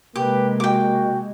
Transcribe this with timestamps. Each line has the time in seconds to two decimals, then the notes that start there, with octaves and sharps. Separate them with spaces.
0.16 C3 G#3 A#3 G4 B4
0.60 F#4 G5 D6